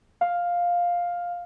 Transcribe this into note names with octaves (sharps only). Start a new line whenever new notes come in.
F5